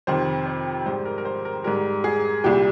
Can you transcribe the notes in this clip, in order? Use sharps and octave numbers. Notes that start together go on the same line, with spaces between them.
F2 C3 D#3 C5
C5
G#2 G3 C5
A#4
A#4
C5
A#4
G#2 G3 A#4
G#4
C2 A#2 G3 G4